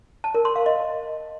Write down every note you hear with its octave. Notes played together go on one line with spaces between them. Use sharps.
A5
A#4
C6
F5
D#5